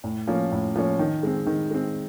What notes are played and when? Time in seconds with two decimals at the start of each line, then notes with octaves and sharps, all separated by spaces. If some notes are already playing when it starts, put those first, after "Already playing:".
0.04 A2
0.27 F3 A#3 C#4
0.52 A2
0.76 F3 A#3 C#4
0.99 D#3
1.23 G#3 C4
1.47 D#3
1.71 G#3 C4